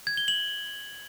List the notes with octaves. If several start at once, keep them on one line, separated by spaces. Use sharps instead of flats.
G#6
G7
F#7